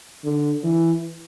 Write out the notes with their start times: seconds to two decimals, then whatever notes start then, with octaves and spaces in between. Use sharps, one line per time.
0.24 D3
0.64 E3